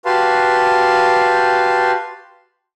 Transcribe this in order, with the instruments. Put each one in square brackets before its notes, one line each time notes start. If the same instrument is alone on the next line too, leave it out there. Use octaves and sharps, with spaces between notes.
[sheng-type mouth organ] F#4 G4 B4 F5 A5 C6